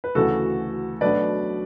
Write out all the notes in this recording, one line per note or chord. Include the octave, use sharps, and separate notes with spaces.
B4
D2 C#3 E3 A3 F#4 A4
B1 B2 A3 D4 B4 D5